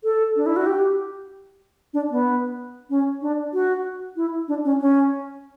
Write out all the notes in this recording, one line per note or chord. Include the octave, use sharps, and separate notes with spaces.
A4
D4
E4
F#4
G4
D4
B3
C#4
D4
F#4
E4
D4
C#4
C#4